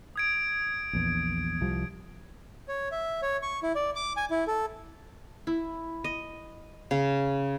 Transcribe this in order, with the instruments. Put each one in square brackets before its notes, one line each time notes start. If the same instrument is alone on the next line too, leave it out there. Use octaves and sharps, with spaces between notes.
[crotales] D#6 G#6 D7
[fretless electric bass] A#1 E2
C2 F3 G3
[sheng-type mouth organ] C#5
E5
C#5
C#6
E4
D5
D6
G#5
E4
A4
[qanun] E4
D#5
C#3